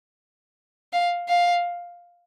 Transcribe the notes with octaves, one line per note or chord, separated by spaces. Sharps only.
F5
F5